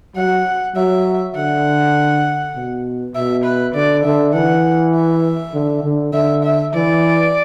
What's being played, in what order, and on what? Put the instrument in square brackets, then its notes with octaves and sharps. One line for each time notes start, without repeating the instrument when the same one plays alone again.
[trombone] F#3 [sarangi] F#5
[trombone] F#3 [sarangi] E5
[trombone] D3 [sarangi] F#5
[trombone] B2
[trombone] B2 [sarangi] E5
[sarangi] B4
[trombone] D3 [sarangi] D5
[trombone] D3 [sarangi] E5
[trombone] E3 [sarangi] F#5
[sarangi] E5
[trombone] D3
D3
[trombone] D3 [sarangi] E5
[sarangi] E5
[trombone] E3 [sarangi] D5